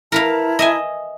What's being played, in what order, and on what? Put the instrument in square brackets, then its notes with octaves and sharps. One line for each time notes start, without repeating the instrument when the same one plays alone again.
[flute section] E4 A5 A#5 [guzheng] A#4 B4 F5
[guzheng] D#5 E5 G#5